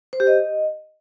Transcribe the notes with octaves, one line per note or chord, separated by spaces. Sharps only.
C5
G4
D#5